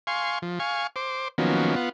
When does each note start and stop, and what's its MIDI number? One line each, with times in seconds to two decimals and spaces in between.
0.07 0.39 77
0.07 0.39 80
0.07 0.39 84
0.07 0.39 85
0.42 0.59 53
0.59 0.87 77
0.59 0.87 80
0.59 0.87 85
0.96 1.28 72
0.96 1.28 86
1.38 1.75 51
1.38 1.75 53
1.38 1.75 54
1.38 1.75 58
1.38 1.75 59
1.38 1.75 61
1.76 1.89 59
1.76 1.89 65
1.76 1.89 78